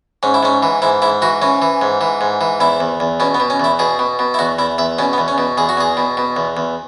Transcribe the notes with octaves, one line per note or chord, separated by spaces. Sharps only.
G#2 C#4
E4
G#2 C#4
E3
G#2 E4
G#2 E4
E3 F#4
E3 C#4
E3
G#2
E3
G#2
E3
E2 E4
E2
E2
B2 C#4
B3
B2
C#4
E2 E4
B2 G#4
B2
B2
E4
E2 F#4
E2 E4
E2 E5
B2 C#4
B3
E2
C#4
B2
E2 G#4
F#4
E2 G#4
B2
B2
E2
E2